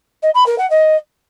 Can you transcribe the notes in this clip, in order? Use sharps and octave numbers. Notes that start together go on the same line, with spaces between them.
D#5
B5
A#4
F#5
D#5